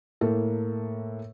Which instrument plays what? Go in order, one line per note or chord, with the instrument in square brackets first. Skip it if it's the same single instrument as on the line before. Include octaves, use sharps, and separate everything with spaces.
[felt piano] A2 A#3 A4 A#4